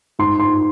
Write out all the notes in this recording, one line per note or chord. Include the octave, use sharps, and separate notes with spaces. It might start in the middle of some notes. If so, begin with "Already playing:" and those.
G#2 C6
C6